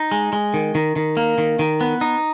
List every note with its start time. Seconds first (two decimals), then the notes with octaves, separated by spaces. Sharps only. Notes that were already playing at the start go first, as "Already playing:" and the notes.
Already playing: D#4
0.12 G#3
0.33 G#3
0.54 D#3
0.75 D#3
0.96 D#3
1.17 A#3
1.38 D#3
1.59 D#3
1.81 B3
2.01 D#4